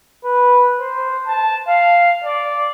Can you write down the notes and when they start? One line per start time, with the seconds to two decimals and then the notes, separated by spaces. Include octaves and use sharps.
0.25 B4
0.80 C5
1.27 A5
1.68 F5
2.24 D5